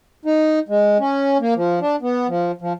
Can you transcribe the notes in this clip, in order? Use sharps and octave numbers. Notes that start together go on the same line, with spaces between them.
D#4
G#3
C#4
A#3
F3
D4
B3
F3
F3